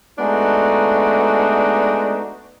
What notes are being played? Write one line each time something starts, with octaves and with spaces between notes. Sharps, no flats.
G#3 A3 B3 D4 D#4 F#4